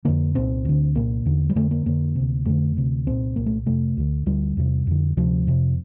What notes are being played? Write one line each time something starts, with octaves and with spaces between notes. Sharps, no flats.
F2 D3 A#3
C2 A#2 C4
D2 D3
C2 A#2 A#3
E2 D3
G3
F2 D3 A3
A#3
F2 D3 A#3
D2 C3
F2 D3 A3
D2 C3
C2 A#2 C4
C2 A#2 A#3
A3
F2 C3 A3
D2 D3
D2 D3 G3
E2 C3
F2 D3
D2 C3 F3
F2 C3